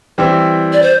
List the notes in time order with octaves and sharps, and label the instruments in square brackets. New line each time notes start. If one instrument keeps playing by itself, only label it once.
[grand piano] E3 G3 C4 E4
[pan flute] D5
C5